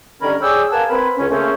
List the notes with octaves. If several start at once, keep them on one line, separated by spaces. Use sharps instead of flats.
D3 D#3 G3 C#4 A#4 B5
G#4 C#5 D5 G5 D6 E6
A#4 B4 F5 F#5 G#5 A5
C4 A#4 B4 B5
C#2 C#4
C#3 A3 A#3 C4 C#4